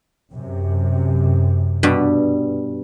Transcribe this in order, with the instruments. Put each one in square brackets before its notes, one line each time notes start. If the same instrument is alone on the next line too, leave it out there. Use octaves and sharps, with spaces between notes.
[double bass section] F#2 C3
[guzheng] G2 B2 G3